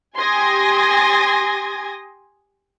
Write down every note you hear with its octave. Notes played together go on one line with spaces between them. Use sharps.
G4 G#5 C6 D#6 G#6 A#6